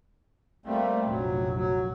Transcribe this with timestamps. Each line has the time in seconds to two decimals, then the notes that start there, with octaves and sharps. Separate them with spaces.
0.66 G3 A3 A#3 C4
1.08 F1 A#1 F#3
1.54 F#3